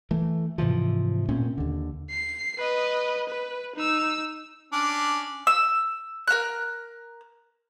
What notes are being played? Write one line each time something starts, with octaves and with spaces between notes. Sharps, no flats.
E3 A3
G#2 C3 E3 F3
A#2 A3 C4 C#4
D#2 D3
C7
B4 D#5
B4
D#4 E6
C#4 D4
E6
A#4 A#5 F6 F#6